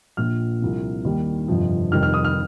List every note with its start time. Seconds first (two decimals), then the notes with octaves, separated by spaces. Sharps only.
0.17 A#1 A#2 F3 F6
0.61 C2 C3 F3
1.05 D#2 D#3 G3
1.48 G1 F2 C3 F3
1.92 F1 F2 D#3 G3 F6
2.03 F6
2.14 D#6
2.24 F6